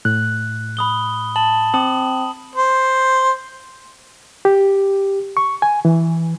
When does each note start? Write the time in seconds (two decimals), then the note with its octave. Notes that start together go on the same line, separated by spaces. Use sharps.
0.05 A2 F#6
0.77 B5 D#6 G7
1.36 A5 F#7
1.74 C4 A5 D#6 F#7
2.56 C5
4.45 G4
5.37 C#6
5.62 G#5
5.85 E3